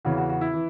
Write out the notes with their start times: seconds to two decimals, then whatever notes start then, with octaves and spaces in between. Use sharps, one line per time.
0.05 E2 C#3 E3 F#4
0.17 F#4
0.29 F#4
0.41 E4
0.53 E3